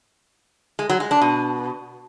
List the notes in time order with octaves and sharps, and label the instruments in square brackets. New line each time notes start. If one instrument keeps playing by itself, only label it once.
[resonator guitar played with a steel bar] G#3
F#3
G#3
D4
B2